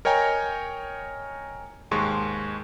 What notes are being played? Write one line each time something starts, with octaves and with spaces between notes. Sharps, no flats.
A#4 C#5 D#5 G5 G#5 A#5
D#2 G#2 G#3 C6 C#6